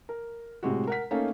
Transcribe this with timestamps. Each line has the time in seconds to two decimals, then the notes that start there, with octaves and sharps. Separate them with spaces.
0.09 A#4
0.63 A2 C3 G#3 F#4
0.87 A#4 F#5 B6
1.11 A3 A#3 C#4 D#4 A4 F5